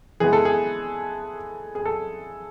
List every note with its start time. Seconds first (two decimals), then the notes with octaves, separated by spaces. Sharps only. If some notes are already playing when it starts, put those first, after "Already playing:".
0.20 E3 G#3 B3 G#4
0.33 A4
0.45 G#4
1.75 G#4
1.85 A4